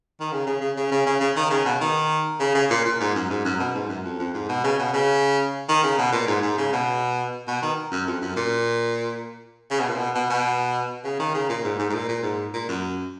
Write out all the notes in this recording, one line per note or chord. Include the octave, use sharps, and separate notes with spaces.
D#3
C#3
C#3
C#3
C#3
C#3
C#3
C#3
D#3
C#3
B2
D#3
C#3
C#3
A#2
A#2
G#2
F#2
G#2
F#2
B2
G#2
F#2
F2
F2
G#2
B2
C#3
B2
C#3
D#3
C#3
B2
A#2
G#2
G#2
C#3
B2
B2
D#3
F#2
F2
F#2
A#2
C#3
B2
A#2
B2
B2
B2
C#3
D#3
C#3
A#2
G#2
G#2
G#2
A#2
A#2
G#2
A#2
F#2